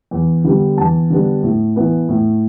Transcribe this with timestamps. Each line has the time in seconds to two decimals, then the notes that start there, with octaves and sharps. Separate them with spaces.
0.11 E2
0.44 D3 G3 B3 D4
0.77 E2 A5
1.10 D3 G3 B3 D4
1.43 A2
1.76 E3 B3
2.09 A2